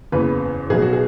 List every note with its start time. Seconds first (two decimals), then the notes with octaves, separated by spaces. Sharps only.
0.12 F#1 E2 C#3 E3 B4
0.70 B1 B2 F#3 G#4
0.82 F#4
0.93 G#4